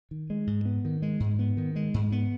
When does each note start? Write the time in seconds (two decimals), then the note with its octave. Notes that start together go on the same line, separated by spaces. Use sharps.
0.11 D#3
0.30 G#3
0.47 G#2
0.65 B3
0.85 D#3
1.02 G#3
1.20 G#2
1.39 B3
1.57 D#3
1.76 G#3
1.94 G#2
2.12 B3